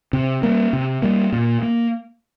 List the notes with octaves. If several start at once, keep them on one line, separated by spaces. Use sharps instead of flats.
C3
G3 A#3
C3
G3 A#3
A#2
A#3